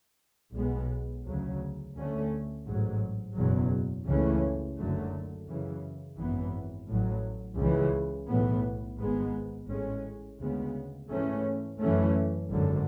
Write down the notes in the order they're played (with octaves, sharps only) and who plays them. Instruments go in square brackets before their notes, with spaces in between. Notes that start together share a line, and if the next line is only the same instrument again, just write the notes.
[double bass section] B1 B2 G#3 B3
D2 C#3 F#3
D2 D3 A3 C#4
A1 G#2 F#3
F#1 E2 B2 F#3
C#2 C#3 E3 A3 C#4
F#1 F#2 D3 F#3 A3
F#2 C#3 E3
G#1 F#2 E3 B3
A1 A2 F#3
C#2 C#3 E3
B1 A2 E3 B3
G#1 G#2 G#3 B3
A1 A2 G#3 C#4
D2 C#3 G#3 B3
G#2 E3 A3 C#4
F#2 E3 A3 C#4
G#1 F#2 D3